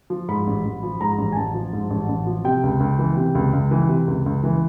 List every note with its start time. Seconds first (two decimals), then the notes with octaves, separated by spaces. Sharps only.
0.10 F3
0.28 G#2 B5
0.47 A1
0.65 A1
0.83 F3
1.00 G#2 A#5
1.18 A1
1.32 G#5
1.36 A1 A5
1.55 F3
1.73 G#2
1.90 A1
2.09 A1
2.27 F3
2.44 C3 G5
2.63 C#2
2.80 C#2
2.99 E3
3.17 C3
3.35 C#2
3.53 C#2
3.71 E3
3.88 C3
4.07 C#2
4.26 C#2
4.44 E3